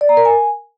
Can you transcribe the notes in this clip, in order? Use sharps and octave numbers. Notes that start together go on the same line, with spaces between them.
D5
A#5
A#4
G#5